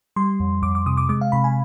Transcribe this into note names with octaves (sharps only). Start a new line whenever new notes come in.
G3 C6
F2
F2 D6
D6
C3 D#6
D6
G#3 D6
F5
C3 B5
G#5